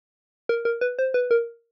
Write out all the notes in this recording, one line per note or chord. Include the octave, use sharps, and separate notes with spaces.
A#4
A#4
B4
C5
B4
A#4